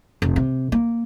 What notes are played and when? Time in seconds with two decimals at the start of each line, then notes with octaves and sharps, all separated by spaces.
0.22 F1
0.36 C3
0.72 A#3